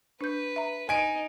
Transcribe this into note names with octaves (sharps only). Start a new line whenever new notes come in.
D4 B4 G6
E5 A#5
D#4 G#5 D7